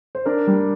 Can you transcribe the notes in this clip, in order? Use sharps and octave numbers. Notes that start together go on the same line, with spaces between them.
C5
D4 A#4
G3